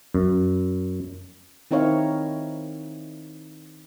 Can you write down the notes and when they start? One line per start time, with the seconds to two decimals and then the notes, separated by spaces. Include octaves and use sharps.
0.14 F#2
1.71 D#3 C4 D#4 E4 C#5 F5